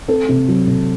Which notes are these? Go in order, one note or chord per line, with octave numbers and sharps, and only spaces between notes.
C4 A4
C3
F#3
C3